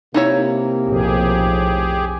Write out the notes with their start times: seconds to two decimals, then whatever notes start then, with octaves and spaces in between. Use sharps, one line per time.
0.14 C3 A#3 D#4 E4 C#5
0.87 B1 F2 A2 G4 G#4